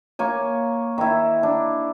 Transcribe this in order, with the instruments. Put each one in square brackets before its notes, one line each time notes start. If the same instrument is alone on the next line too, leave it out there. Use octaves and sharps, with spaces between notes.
[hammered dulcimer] A#3 C#5 G#5
D#3 E4
D4